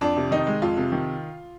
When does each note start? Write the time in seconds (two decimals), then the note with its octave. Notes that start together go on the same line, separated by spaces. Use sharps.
0.01 F2 D4
0.16 C3
0.31 D#3 D#4
0.47 G#3
0.62 F2 F4
0.77 C3
0.92 D#3